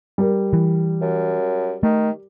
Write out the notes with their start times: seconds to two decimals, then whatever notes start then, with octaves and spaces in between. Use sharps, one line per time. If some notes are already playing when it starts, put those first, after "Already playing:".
0.18 G3 A#4
0.53 E3
1.01 F#2
1.83 D#3 A3